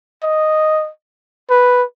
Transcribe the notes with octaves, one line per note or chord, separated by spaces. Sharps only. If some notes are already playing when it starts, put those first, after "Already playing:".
D#5
B4